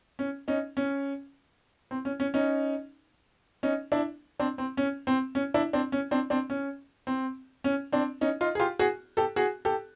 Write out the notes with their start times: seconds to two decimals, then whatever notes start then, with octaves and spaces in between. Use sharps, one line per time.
0.19 C#4
0.48 C#4 D#4
0.77 C#4
1.91 C4
2.05 C#4
2.20 C#4
2.34 C#4 D#4
3.63 C#4 D#4
3.92 D4 E4
4.40 C4 D4
4.58 C4
4.77 C#4
5.07 C4
5.35 C#4
5.54 D4 E4
5.73 C4 D4
5.92 C#4
6.11 C4 D4
6.30 C4 D4
6.50 C#4
7.07 C4
7.64 C#4
7.92 C4 D4
8.21 C#4 D#4
8.41 D#4 F4
8.55 G#4
8.60 F4 G4
8.79 F#4 G#4
9.17 G4 A4
9.36 F#4 G#4
9.65 G4 A4